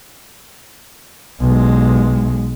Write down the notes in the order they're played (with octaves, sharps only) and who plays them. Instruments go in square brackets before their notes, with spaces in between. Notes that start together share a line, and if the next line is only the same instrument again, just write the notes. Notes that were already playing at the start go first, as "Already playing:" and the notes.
[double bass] B1 G#3